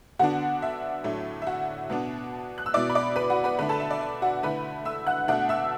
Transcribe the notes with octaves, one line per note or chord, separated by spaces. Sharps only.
D3 B3 D4 F#4 F#5
E5
A2 F#3 A3 D4
E5
F#4 F#5
B2 B3 D4
F#6
E6
B2 B3 E4 D5 D6
B5
D5 D6
B4 B5
F#4 F#5
B4 B5
D3 A3 D4 B4 B5
A4 A5
E5
D5
E5
F#4 F#5
D3 A3 E4 B4 B5
E5 E6
F#5 F#6
B2 A3 D4 F#5 F#6
E5 E6